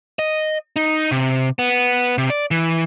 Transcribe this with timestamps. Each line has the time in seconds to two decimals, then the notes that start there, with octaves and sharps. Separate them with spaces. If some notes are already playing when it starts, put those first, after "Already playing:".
0.19 D#5
0.76 D#4
1.12 C3
1.59 B3
2.18 C3
2.30 D5
2.51 E3